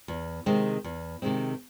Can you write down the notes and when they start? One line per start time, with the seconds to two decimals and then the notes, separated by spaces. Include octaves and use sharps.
0.08 E2
0.46 C3 D#3 G#3 C4
0.84 E2
1.22 C3 D#3 G#3 C4